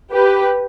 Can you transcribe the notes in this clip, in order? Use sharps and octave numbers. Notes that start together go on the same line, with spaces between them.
G4 B4